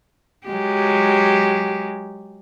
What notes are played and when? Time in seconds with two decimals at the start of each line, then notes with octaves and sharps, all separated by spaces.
0.48 F#3 G#3 G4